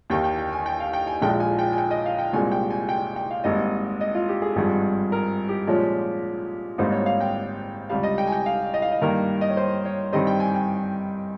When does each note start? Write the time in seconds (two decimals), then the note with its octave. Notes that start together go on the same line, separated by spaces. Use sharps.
0.10 D#2 D#3 A#3 G5
0.24 G5
0.38 G5
0.52 G#5
0.66 G5
0.80 F5
0.93 G5
1.07 G#5
1.21 A#1 A#2 F3 G#3 G5
1.40 G#5
1.59 G5
1.73 G#5
1.78 G5
1.91 D#5
2.06 F5
2.18 G5
2.33 C2 A#2 G#3 G#5
2.52 G5
2.70 G#5
2.89 G5
3.16 G5
3.31 F5
3.44 G#1 G#2 G3 A#3 D#5
4.01 D#5
4.15 F4
4.29 G4
4.42 G#4
4.56 G#1 G2 F3 G#4
5.12 A#4
5.49 G4
5.67 A#2 F3 G#3 C#4
6.78 G#1 G#2 G3 A#3 D#4 C5
6.92 C#5
7.06 F5
7.20 G5
7.89 C#2 C3 G3 F5
8.03 D#5
8.18 G5
8.27 G#5
8.32 G5
8.46 F5
8.74 D#5
8.82 F5
8.92 D#5
9.02 G2 D#3 A#3 A#4
9.41 D#5
9.50 C#5
9.57 C5
9.85 C#5
10.12 G2 D#3 G3 C4 D#5
10.27 G5
10.40 G#5
10.55 G5